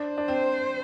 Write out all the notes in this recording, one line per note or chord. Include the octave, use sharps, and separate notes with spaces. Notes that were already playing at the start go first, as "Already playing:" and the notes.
Already playing: D4 C5
D4
C4